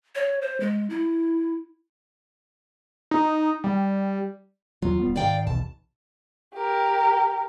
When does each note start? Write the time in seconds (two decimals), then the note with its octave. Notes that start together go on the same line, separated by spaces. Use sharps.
0.15 C#5
0.42 C5
0.60 G#3
0.90 E4
3.11 D#4
3.64 G3
4.82 E2 F#3 F4
4.99 D1 G3 B3
5.16 G#2 D#3 D5 F5 G5
5.47 B1 E2 B2 A5
6.54 G4 A#4